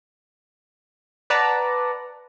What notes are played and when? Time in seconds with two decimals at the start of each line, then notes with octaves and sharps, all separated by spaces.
1.30 B4 D5 F#5 A5 A#5